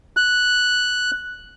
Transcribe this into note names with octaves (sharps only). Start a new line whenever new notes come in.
F#6